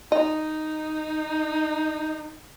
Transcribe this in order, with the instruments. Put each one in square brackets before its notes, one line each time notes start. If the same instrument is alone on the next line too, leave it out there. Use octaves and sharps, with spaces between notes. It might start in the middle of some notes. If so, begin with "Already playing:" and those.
[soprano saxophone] D#4 [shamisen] D#5